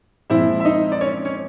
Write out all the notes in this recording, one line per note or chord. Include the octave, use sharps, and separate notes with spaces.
A#2 F3 G#3 C4 E4 E5
E5
D#4 D#5
D5
C#4 C#5
C#4 C#5